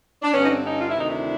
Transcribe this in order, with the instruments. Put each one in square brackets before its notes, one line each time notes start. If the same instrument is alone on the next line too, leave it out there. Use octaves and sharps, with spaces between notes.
[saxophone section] D4
G2 D3 B3 C#4
D#4
C4 D4
C#4 D#4
F4
E4
D2 C3 D#3 D#4
D4 E4